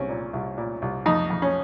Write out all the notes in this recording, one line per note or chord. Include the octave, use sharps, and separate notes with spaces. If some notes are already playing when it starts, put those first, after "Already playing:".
Already playing: C2 C4 C#4
A#2
C2
A#2
C2
F2 D#4
F2
C#4